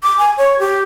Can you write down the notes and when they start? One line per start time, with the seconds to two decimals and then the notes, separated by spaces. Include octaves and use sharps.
0.03 D6
0.18 G#5
0.38 C#5
0.59 G4